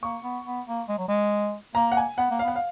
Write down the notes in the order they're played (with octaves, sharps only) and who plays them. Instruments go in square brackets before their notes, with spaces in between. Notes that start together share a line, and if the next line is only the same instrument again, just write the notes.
[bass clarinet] A#3 [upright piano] C#6
[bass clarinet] B3
B3
A#3
G#3
F#3
G#3
[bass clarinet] A#3 [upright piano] A#5
[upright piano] F#5
G#5
[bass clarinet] B3 [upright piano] F#5
[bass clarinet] A#3
[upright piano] F5
[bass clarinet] B3 [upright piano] F#5
[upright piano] F5